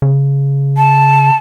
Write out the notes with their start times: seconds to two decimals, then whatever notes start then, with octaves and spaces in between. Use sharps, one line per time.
0.02 C#3
0.77 A5